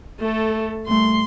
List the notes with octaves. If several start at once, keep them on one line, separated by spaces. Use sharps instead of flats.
A3 A4
A#2 G3 A3 C6